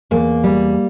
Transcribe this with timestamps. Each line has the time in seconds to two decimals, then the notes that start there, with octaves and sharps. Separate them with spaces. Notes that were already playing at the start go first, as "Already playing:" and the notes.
0.11 E2 A#3
0.44 G3